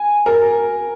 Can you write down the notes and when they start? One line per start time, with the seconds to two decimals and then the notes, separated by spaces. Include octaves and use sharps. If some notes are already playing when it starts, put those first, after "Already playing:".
Already playing: G#5
0.26 A#4